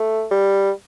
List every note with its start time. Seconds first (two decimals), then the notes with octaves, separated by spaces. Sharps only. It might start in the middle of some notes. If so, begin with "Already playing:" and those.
Already playing: A3
0.31 G3